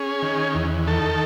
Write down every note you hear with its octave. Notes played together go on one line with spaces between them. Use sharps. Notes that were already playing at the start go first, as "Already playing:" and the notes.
Already playing: C#4 G#4
D#3
E2
D#3 A4